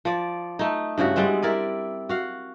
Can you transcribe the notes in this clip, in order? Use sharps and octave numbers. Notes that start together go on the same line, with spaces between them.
F3 D5
A3 D#4
G2 C#3 E4 F#4
G3 G#3 B3 C4
E4 A#4 D5
F#4 F5